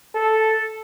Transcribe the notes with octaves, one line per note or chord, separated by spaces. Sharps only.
A4